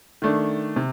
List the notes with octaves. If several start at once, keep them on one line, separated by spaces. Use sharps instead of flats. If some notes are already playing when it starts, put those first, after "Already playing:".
D#3 A3 D4
C3